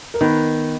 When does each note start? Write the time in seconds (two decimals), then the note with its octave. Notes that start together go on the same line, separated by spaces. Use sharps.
0.14 A#4
0.21 D#3 B3 B4